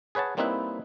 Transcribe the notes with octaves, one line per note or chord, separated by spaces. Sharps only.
G#4 B4 C#5 F#5 A5
G3 A#3 C4 D#4 E4 B4